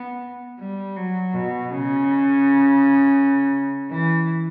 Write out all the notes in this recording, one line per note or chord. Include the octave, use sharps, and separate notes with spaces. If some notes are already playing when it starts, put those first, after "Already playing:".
Already playing: B3
G3
F#3
B2
C#3
E3